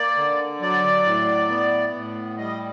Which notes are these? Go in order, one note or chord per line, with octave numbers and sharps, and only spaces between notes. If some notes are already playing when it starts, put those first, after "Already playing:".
Already playing: A#3 D5
D3
F#3 D5
A2
B3
A2
G3 D#5